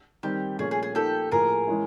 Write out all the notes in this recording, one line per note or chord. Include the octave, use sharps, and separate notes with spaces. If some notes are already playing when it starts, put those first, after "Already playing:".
D#3 G3 C4 G4
A#2 F3 A3 C#4 G#4
G#4
G#4
F3 A#3 D#4 G4 A4
A2 F3 A#3 G#4 A#4
E3 G#3 C#4 E4